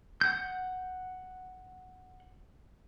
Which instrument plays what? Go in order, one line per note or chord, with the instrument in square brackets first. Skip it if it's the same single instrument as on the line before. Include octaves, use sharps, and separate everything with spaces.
[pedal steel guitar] F#5 G6